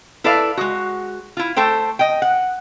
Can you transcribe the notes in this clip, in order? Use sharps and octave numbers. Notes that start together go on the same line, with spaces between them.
E4 A4 B4 D5 E5 F5
G#3 F#4
E4 F4
A3 A4 C5 G5
D#5 G5
F#5